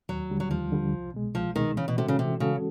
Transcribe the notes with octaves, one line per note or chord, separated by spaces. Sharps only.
D#2 F#3
D3 G3
F#3
D#2 F3
D3 G3
C2
B2 G#3
C2 F3
B2 D#3 G#3
C#3 E3
B2
C3 G#3 C#4 F#4 A4
C#3
C3 E3
C#3 G#3 C#4 F#4 A4